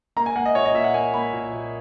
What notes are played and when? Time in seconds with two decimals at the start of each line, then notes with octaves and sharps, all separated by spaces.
0.16 A#3 A#5
0.26 G#5
0.36 A#3 F#5
0.46 D#5
0.55 A#2 C#5
0.65 D#5
0.74 A#2 E5
0.84 F#5
0.94 A#3 G#5
1.14 A#3 B5
1.33 A#2
1.53 A#2